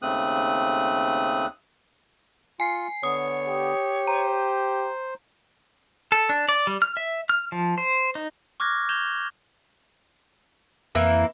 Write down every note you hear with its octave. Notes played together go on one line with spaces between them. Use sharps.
D#2 C#3 A3 C4 D#6 F#6
F4 G#5 C7
D3 B3 C#5 D#6
G4
C5 A#5
A4
D4
D5
G3
F6
E5
F6
F3
C5
D#4
C#6 D6 F6 F#6 G#6 A#6
G6 G#6 E7 F7 G7
F2 E3 A#3 E4